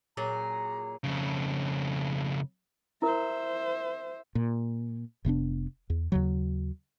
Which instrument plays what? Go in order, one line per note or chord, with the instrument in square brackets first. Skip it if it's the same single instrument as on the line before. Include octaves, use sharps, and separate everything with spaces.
[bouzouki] A#2 F#3 G#4 [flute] A#5
[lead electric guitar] F2 C#3
[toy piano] E4 A#4 [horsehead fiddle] C5 E5
[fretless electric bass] A#2
F1 C3 B3 D4
E2
D#2 C#3 F#3